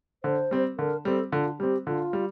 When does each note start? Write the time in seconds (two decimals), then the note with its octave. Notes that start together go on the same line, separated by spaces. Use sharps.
0.24 D3 C5
0.51 G3 C4
0.78 D3 A#4
1.05 G3 C4 A4
1.32 D3 F4
1.59 G3 C4 G4
1.87 D3 F4
2.13 G3